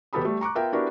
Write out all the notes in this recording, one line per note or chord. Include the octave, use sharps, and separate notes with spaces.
E1 B3 G4 A4 B5 D#6
G3 A3
A#5 C#6 D6 F#6
B3 F4 A#4 E5 G5
B3 D4 E4 F#4 G4 A#4